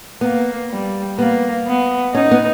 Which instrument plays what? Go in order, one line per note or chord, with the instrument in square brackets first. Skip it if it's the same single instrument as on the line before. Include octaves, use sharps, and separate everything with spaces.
[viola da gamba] A#3 [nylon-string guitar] B3
[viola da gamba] G3
[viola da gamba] A#3 [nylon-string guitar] B3
[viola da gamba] B3
[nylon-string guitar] C#4 [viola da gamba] D#4
[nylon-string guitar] B3